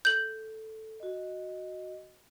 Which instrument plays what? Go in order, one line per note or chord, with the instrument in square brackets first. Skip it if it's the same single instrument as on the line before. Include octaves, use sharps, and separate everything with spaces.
[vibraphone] A4 [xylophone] G6 F#7
[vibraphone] F#4 D#5